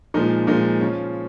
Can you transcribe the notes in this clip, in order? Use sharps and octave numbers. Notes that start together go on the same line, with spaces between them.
A#2 F3 G#3 D#4
A#2 F3 G#3 D#4
C#3 F3 C#4